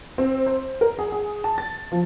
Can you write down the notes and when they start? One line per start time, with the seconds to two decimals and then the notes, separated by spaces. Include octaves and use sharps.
0.18 C4
0.46 C5
0.81 A#4
0.99 G#4
1.12 G#4
1.44 A5
1.58 A6
1.92 F3